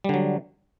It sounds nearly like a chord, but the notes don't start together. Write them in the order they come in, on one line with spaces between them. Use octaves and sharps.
G3 D3 F#3